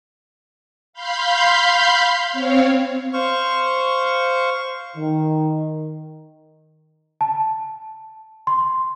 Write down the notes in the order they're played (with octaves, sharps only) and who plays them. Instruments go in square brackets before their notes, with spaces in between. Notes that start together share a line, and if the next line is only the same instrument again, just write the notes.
[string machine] F5 B5 C6 G6
C4 C#5 F5
[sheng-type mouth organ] C5 F5 C#6
[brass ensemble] D#3
[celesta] A5
C6